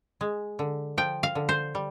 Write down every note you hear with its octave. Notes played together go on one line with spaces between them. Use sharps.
G#3
D3
F3 G5
F5
D3
C5
G3